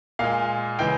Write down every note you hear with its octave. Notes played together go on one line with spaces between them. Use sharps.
A#2 G#3 F5
C#3 E3 G#3 G5